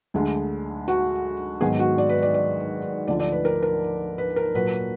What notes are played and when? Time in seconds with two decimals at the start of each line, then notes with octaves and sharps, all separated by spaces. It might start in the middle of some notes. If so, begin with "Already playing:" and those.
0.14 D2 D3 G#3
0.88 F#4
1.61 G#2 D#3 F#3 B3 G#4
1.79 F#4
1.98 D5
2.09 B4
2.22 D5
2.34 D5
3.07 D2 D3 F3 D5
3.20 D5
3.32 B4
3.45 A#4
3.63 A#4
4.18 B4
4.36 A#4
4.55 A#2 F#3 A#3 B4